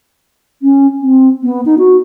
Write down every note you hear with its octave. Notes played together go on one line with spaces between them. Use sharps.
C#4
C4
B3
D#4
F#4